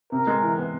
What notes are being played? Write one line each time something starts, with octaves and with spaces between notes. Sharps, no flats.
C3 A#4
G#3
E3
B3